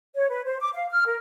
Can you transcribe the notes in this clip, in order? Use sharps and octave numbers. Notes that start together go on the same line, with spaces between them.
C#5
B4
C5
D6
F5
F6
A#4